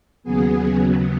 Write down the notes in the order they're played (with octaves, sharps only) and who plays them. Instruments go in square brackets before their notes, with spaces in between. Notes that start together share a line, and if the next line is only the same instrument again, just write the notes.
[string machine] D#2 C#3 F#3 B3 G#4